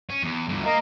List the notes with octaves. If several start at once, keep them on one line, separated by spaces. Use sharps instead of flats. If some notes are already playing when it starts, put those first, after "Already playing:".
C#4
E2
D2 G2 D3
A#3 A#4 D#5 A#5